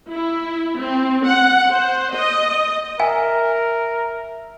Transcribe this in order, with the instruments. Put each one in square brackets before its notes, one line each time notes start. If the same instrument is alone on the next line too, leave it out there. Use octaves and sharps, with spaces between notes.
[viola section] E4
C4
F#5
C5
D#5
[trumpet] A#4 [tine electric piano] E5 [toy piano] G#5